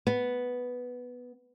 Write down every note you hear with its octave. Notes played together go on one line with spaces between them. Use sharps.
B3